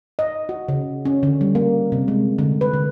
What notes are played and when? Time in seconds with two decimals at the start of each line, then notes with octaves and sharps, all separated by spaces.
0.19 D#5
0.49 F#4
0.69 C#3
1.05 C#4
1.23 D3
1.41 G3
1.55 A#3
1.92 C3
2.08 G#3
2.38 D3
2.61 B4
2.74 D3